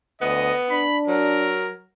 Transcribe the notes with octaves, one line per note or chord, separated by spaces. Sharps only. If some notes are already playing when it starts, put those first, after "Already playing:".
D2 B3 D#5
D4 B5
F#3 A#4